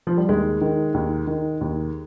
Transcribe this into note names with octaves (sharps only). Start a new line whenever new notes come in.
F3
G3
D#2 G#3
D#3
D#2
D#3
D#2